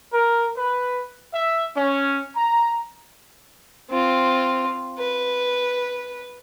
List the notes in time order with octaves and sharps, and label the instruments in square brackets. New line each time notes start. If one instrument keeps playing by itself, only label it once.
[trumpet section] A#4
B4
E5
C#4
A#5
[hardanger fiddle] C4 F4
B4